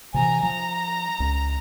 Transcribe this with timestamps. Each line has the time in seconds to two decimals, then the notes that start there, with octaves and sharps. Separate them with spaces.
0.14 C3 D#3 E3 G#5 A#5
0.43 F3 A#5
1.20 C#2